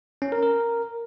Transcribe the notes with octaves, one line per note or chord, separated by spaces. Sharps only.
C#4
A#4
A#4